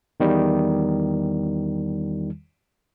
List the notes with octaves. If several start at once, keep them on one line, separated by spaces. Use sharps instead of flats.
E2 D#3 G3